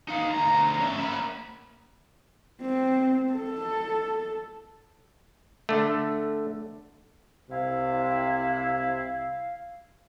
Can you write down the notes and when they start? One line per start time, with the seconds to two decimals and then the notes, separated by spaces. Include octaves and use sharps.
0.08 D#4 F5
0.32 D2 A#5
0.79 C#4 E5
1.00 A#3 B5
2.61 C4
3.34 A4
5.69 D3 A3
7.51 C2 C3 E4 F5